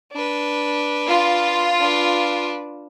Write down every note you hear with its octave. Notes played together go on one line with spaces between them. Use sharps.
D4 B4
F4
D4 B4